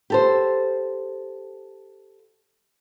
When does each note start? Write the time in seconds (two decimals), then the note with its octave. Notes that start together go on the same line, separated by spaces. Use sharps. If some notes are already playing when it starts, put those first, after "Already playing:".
0.10 G4 A4 C5